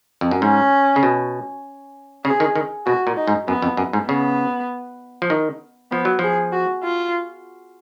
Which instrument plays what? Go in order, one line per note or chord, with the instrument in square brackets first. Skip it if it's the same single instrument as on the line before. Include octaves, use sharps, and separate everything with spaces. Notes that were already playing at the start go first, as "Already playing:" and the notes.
[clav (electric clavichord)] F2
F#2
[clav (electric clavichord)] G#2 [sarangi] C#4
[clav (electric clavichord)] C#3
B2
[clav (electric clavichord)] C#3 [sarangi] G#4
[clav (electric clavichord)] D#3
D#3
[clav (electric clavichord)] B2 [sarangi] F#4
[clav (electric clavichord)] A#2
[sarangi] D#4
[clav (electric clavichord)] G#2
[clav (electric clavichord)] F#2 [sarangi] B3
[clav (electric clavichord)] F2
F#2
G#2
[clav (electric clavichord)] C#3 [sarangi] B3
[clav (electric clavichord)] F3
D#3
[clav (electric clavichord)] F3 [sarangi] B3
[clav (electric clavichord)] F#3
[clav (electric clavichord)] F3 [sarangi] G#4
[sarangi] F#4
F4